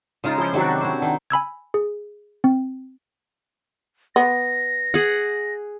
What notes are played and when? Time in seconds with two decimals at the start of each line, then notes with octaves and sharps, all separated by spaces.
0.24 C#3 G#3 D#4 F4 A#5
0.38 F3 E4 C6
0.53 C3 D#3 F#3 C4 D4 F#4
0.81 C4 E4 C5
1.02 D#3
1.30 G#5 B5 E6 G#6
1.74 G#4
2.44 C4
4.16 B3 A#6
4.94 G#4 F#5